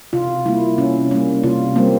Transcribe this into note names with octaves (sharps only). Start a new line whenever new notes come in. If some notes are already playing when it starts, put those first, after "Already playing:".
C3 F4
G3 A#3 E4
C3 C#4
G3 A#3 C#4
C3 F4
G3 A#3 C4